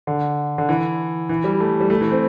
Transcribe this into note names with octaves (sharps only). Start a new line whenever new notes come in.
D3
D3
E3
E3
G3
A3
G3
A3
E3
C4